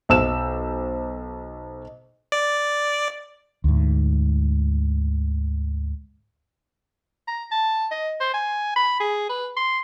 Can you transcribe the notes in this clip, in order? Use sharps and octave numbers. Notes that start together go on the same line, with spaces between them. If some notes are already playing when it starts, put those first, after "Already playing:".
B1 C5 E6 E7
D5
D2 G#2
A#5
A5
D#5
C5
G#5
B5
G#4
B4
C6